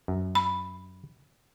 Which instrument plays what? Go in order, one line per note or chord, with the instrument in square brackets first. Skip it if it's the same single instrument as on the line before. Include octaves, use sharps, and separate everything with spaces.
[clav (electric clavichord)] F#2
[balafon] B5